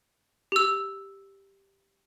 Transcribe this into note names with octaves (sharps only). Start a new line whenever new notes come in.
G4 E6